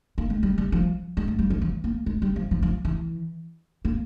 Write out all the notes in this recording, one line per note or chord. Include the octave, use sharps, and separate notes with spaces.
A#3
G#3
G3
G3
F3
G#3
G#3
G3
F3
E3
A#3
G#3
G3
F3
F3
F3
E3
A#3